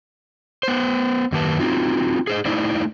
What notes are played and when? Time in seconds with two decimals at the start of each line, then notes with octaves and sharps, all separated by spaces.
0.63 B3 C5
1.32 F#2 D#3 A#3 G4 B4 A5
1.59 C4 D#4 F4 F#4
2.27 G#4 C5 D#5
2.45 A3 D#4 E4 C5 D5